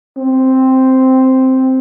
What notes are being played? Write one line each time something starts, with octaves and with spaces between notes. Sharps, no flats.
C4